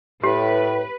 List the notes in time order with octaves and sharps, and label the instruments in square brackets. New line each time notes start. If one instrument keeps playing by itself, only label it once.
[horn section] A2 [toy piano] G4 [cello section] B4